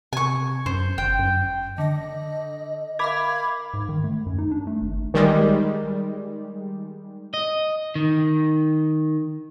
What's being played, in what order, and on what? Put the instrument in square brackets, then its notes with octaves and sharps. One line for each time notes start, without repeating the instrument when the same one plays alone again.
[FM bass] C3 [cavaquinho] G#5 C#6
[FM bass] F#2 [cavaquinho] C5
[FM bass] G1 [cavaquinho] G5
[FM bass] F#2
[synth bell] D3 A#6 [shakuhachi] D#5
[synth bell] A#4 E5 F5 [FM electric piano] B5 D6 G#6
[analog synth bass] G#2
D#3
A3
F#2
D#4
D4
A3
G#1
[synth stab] D#3 G3 G#3
[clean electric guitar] D#5
D#3